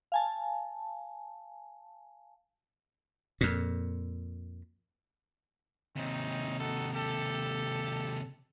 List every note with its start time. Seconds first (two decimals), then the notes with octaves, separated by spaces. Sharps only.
0.12 F5 G#5 A5
3.41 F2 A#2
5.96 D#2 C3 C4 C#4 D#4
6.60 D#4 F#4 A4
6.94 G4 A4